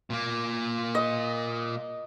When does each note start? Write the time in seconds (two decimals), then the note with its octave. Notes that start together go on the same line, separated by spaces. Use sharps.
0.10 A#2 A#3
0.95 D#5